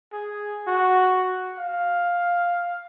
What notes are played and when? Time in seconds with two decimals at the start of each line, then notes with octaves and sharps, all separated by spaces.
0.12 G#4
0.67 F#4
1.58 F5